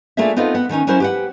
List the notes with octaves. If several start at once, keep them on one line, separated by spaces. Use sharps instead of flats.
A3 A#3 D4 F4 G#4 E5
B3 C4 D#4 F4 A4 B4
B3 F#5
D3 D#3 C#4 D#4
F#3 C#4 E4 A#4 C5 F#5
G4 B4 F#5